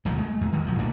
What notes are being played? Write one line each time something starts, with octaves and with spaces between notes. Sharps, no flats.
E1 D#2 F3 F#3
G#3 A3
E2
D#3 G3 G#3
B1 F3 F#3
A#2 A3 A#3 D4